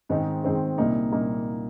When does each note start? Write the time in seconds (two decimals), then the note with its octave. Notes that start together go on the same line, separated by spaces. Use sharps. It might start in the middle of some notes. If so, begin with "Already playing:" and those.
0.09 G#2 D#3 G#3 C4 D#4
0.44 G#2 D#3 G#3 C4 D#4
0.78 C2 A#2 A#3 D#4
1.12 C2 A#2 A#3 D#4